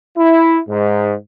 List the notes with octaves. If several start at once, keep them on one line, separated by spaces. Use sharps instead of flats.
E4
G#2